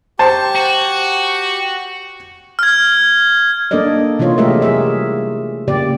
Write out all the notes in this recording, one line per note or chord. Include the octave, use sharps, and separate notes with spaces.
G4 C5 A5 C#6
F#4
F6 G#6
A#3 D4 A4 A#4 D5 D#5
C3 E3 A#3 F4 C#5
G#3 A3 G4 A#4 D#5 E5
G3 G#4 E5
C#3 A#3 G4 D5